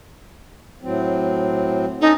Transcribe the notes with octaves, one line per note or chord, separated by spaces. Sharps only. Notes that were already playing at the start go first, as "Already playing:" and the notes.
A2 F#3 C4
C#4 D#4 A4